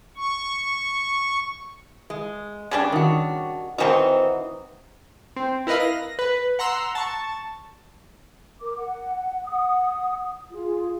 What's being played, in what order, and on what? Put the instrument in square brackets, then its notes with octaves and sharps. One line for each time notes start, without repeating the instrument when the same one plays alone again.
[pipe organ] C#6
[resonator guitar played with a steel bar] G#3
[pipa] C#3 G3 D4
[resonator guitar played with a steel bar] D#3 F#4
[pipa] D#3 E3 D#4 [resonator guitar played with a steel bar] C4 F#4
[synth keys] C4
E4 A#4 B4 D#5 F5
A#6
B4
F#5 A#5 C6 E6
A5 C#6
[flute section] A#4 D6
F#5
F#5 D#6
F4 G#4